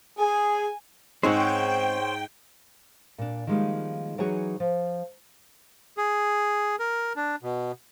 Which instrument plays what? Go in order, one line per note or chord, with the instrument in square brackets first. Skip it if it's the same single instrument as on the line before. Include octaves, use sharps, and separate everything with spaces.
[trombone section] G#4 [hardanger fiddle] G#5
[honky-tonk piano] G#2 [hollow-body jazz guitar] G#3 C4 C#4 [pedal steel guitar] C5 C#5 F#5 [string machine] G5
[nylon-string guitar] A#2 D4
D#3 F3 G3 G#3 A#3 D#4
E3 F#3 D#4 F#4 G#4 C#5
F3
[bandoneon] G#4
A#4
D4
B2